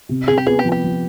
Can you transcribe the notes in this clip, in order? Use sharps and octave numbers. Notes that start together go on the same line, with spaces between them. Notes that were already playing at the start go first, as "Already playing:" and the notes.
C3
C3 G#4
G4
B3 G#4
G4
F3
G4
F3